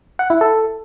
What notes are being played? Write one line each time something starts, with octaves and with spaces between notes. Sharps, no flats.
F#5
E4
A4